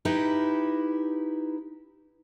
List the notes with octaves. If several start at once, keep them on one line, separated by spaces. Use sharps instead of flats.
D#4 E4 G4 B4